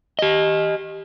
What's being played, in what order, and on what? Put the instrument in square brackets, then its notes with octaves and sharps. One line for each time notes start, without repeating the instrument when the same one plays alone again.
[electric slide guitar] G4 D#5